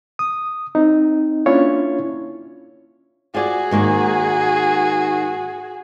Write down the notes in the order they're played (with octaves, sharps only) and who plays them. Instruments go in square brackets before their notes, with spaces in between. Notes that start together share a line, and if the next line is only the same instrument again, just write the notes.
[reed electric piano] D#6
C4 D#4
A#3 C#4 D4 E4 F4 C#5
[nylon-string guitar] F4 D5 [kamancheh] F#4 G#4
[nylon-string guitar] G#2 D#3 A#3